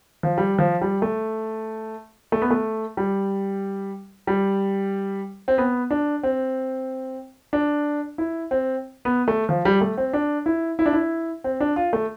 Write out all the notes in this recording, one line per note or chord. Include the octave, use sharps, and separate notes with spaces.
F3
G3
F3
G3
A3
A3
B3
A3
G3
G3
C4
B3
D4
C4
D4
E4
C4
B3
A3
F3
G3
A3
C4
D4
E4
E4
D4
E4
C4
D4
F4
A3